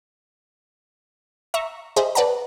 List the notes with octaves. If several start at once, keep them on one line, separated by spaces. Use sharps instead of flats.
E5 A#5 C#6
G#4 C5 D#5 E5
B4 D5 F#5 A5 A#5